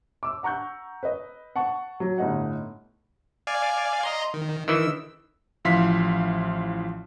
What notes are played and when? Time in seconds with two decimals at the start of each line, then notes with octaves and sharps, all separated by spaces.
0.23 D6 E6
0.43 F#5 A#5 C#6 F#6 G6
1.03 B4 D#5
1.56 F#5 A5 C#6
2.00 F#3
2.18 G1 A2 D#4 F#5
3.47 D5 F5 G#5
4.03 D#5 A#5 C6
4.34 D#3
4.68 D#3 E3 E6
5.65 A1 F3 E4 F5 C6 B6